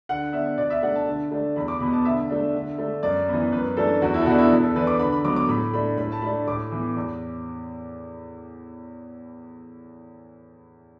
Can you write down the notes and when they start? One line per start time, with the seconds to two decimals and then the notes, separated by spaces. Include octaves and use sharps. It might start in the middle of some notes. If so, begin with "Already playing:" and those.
0.09 D3 F#5
0.33 B3 D4 E5
0.58 B2 D5
0.70 E5
0.83 A3 D4 F#5
0.95 A5
1.07 D3
1.31 A3 D4
1.56 E2 B5
1.68 D6
1.80 B2 B3 B5
1.93 A5
2.05 D3 E5
2.30 A3 D4
2.54 D3
2.78 A3 D4
3.03 F#2 D5
3.28 E3 B3
3.52 F#2 B4
3.77 E3 A3 D4 A4
4.02 E2 F#4
4.14 E4
4.21 A4
4.26 B2 B3 D4 F#4
4.38 E4
4.51 E2
4.63 A4
4.76 E3 D4 B4
4.87 D6
4.99 D3 B5
5.12 B5
5.24 F#3 B3 D6
5.36 D6
5.48 A2 B5
5.73 A3 D4 B5
5.98 A2 B5
6.12 A5
6.22 A3 D4 B5
6.47 A2 D6
6.72 E3 B3
6.96 E2